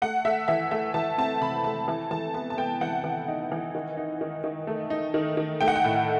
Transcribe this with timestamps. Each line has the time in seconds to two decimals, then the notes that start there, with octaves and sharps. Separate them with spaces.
0.02 A3 F#5
0.25 A3 E5
0.48 E3 E5
0.71 A3 E5
0.94 E3 A5
1.18 C4 A5
1.41 C3 B5
1.64 A3 A5
1.88 E3 A5
2.11 E3 A5
2.34 B3 A5
2.50 A5
2.57 B3 G5
2.81 E3 F#5
3.04 E3
3.28 D#4
3.52 E3
3.75 D#3
3.97 D#4
4.21 D#3
4.44 D#3
4.67 A3
4.90 D#4
5.14 D#3
5.37 D#3
5.61 A3 G5
5.68 F#5
5.76 G5
5.84 A2